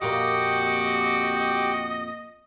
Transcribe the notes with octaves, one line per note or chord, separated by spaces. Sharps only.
F2 A#2 A#3 F#4 G4 D#5 G5 D6